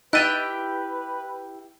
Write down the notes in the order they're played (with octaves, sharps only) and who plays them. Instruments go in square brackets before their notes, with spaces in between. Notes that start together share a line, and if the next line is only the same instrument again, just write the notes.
[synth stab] D#4 [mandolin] E4 G4 G5 [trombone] B4 [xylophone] F#6 A6 D#7